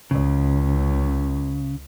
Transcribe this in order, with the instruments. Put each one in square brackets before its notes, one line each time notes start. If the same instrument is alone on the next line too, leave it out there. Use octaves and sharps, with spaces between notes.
[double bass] C#2 [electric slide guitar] C#3